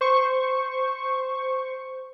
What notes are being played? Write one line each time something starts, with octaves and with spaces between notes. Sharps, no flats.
C5 C#6